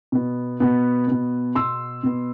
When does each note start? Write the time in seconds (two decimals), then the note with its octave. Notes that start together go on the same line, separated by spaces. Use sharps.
0.12 B2 B3
0.60 B2 B3
1.08 B2 B3
1.55 B2 B3 C6 E6
2.03 B2 B3